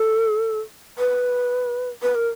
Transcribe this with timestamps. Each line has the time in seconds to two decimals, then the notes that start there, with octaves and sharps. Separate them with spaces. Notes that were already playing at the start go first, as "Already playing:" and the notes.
Already playing: A4
0.98 B4
2.02 B4
2.15 A#4